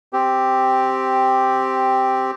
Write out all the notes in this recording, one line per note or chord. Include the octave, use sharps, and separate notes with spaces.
C4 G4